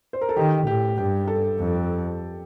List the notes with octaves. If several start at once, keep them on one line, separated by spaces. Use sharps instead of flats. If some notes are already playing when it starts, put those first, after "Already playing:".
C5
A#4
A4
D#3 G4
A2 G4
G2 G4
A4
F2